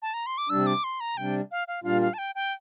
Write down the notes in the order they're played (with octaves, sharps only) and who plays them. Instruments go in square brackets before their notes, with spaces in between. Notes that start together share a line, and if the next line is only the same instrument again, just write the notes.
[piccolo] A5
A#5
C6
D6
[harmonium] C3 G3 D4 [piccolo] E6
[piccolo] D6
C6
A#5
[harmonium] C3 G3 D4 [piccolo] G5
[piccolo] F5
F5
[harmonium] A#2 G3 D4 F4 [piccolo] F5
[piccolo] F5
A5
G5
G5